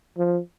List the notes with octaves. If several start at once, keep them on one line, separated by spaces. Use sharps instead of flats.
F3